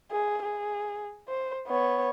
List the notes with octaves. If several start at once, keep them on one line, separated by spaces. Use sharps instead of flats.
G#4
G#4
C5
B3 C#5